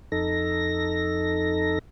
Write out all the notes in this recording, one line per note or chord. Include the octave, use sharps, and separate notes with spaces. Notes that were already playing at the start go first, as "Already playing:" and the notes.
F2 D#4 A4 A#6